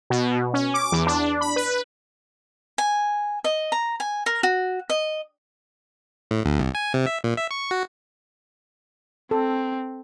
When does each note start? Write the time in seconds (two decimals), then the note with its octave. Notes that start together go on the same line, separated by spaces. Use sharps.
0.10 B2
0.54 C#4
0.74 D6
0.92 E2
1.07 D4
1.41 B5
1.56 B4
2.78 G#5
3.44 D#5
3.72 A#5
4.00 G#5
4.26 A#4
4.43 F#4
4.90 D#5
6.31 A2
6.45 D2
6.60 C2
6.75 G#5
6.94 C3
7.06 E5
7.24 A#2
7.37 E5
7.51 C#6
7.71 F#4
9.31 C4 A4